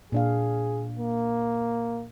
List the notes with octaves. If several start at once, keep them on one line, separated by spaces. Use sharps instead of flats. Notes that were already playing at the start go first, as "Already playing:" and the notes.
A#2 D4 G#4 F5
A#3